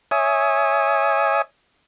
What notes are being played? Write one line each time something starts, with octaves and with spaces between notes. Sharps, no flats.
C#5 E5 G#5 D#6